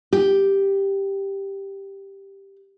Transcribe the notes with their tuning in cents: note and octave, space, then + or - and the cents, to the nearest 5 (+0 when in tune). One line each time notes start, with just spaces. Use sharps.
G4 +0